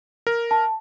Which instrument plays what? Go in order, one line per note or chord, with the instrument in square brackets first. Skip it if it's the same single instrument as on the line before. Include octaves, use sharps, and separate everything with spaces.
[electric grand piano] A#4
[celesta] A5